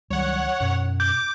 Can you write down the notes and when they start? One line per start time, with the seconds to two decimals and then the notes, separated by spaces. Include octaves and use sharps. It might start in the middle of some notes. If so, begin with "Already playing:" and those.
0.10 C#2 D#3 F#3 G3 C#5 F#5
0.61 F#2 B2
1.00 D6 G6